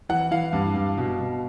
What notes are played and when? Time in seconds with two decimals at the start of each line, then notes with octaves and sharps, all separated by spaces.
0.09 E3 F#5
0.31 E3 F5
0.53 G2
0.75 G2
0.97 B2
1.19 B2